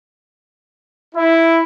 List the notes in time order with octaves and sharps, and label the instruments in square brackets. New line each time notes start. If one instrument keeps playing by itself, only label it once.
[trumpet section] E4